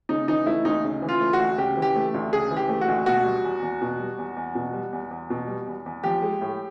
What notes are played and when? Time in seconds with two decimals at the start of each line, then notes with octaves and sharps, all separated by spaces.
0.09 C#3 D#4
0.28 E3 D#4
0.46 A3 E4
0.65 D2 D#4
0.84 C#3
1.02 E3
1.09 F4
1.20 A3
1.33 F#4
1.39 D2
1.57 C#3 G4
1.77 E3
1.82 G4
1.95 A3
2.14 D2
2.33 C#3 G#4
2.51 E3
2.57 G4
2.69 A3
2.81 F#4
2.88 D2
3.06 B2 F#4
3.25 G3
3.44 E2
3.62 E2
3.82 B2
4.00 G3
4.18 E2
4.37 E2
4.55 B2
4.73 G3
4.93 E2
5.11 E2
5.30 B2
5.48 G3
5.67 E2
5.86 E2
6.03 F3 G4
6.22 G#3
6.41 A2